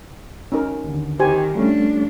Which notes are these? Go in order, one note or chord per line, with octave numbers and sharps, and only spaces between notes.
C#4 D#4 A#4
D#2 D3
D#3 G4 C5 G#5
F3 G3 A3 C#4 D4